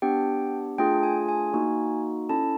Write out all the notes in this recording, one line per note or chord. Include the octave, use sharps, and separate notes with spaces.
B3 D4 G4 G5
A3 D4 F4 G#4 G5
G#5
G#5
A#3 D#4 F#4
C#4 E4 A4 A5